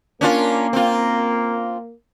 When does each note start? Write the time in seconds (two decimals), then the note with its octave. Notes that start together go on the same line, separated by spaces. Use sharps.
0.21 A#3 C#4 D4 F4
0.73 C4 F4